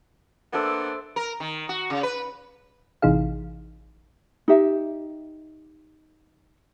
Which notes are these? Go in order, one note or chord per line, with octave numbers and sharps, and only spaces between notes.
A#3 B3 D4 A4 C5 E5
A#4
D#3
F#4
C#3
B4
A1 C3 E3 D#4 G#4 F5
D#4 G4 E5